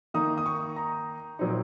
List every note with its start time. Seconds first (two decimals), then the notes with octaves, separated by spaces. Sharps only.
0.14 D#3 A#3 D#4 D#6
0.38 D#6
0.46 C#6
0.76 A#5
1.39 A#2 F#3 C4 D#4